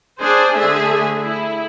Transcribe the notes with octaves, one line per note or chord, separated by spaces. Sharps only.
D4 G#4 C5
D3 A3 G#4 E5
E4